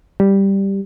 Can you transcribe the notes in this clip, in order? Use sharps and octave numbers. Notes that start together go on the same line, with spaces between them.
G3